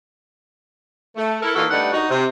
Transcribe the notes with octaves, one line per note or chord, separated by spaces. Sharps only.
A3
E4 A4 A#4
A#2 E3 D#4 F4 F#4 A4
G2 G3 A3 D#4 F#5
D#4 F#4
C3